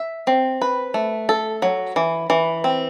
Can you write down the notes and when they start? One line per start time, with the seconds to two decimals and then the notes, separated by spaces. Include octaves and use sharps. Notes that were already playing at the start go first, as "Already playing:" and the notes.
Already playing: E5
0.27 C4
0.62 B4
0.94 A3
1.29 A4
1.62 F#3
1.96 E3
2.30 E3
2.64 C4